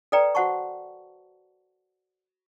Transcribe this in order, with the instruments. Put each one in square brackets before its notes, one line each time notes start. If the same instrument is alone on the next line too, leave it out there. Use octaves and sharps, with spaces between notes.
[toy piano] A4 B4 D5 G5 A#5
F#4 C5 F#5 A5 C#6